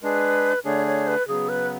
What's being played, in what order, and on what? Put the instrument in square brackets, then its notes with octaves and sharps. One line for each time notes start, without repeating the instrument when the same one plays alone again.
[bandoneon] G#3 D4 G#4 [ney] B4
[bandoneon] D3 A3 D4 G#4 [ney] C#5
[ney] C#5
B4
[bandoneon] C#3 F#3 B3 [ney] G#4
[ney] B4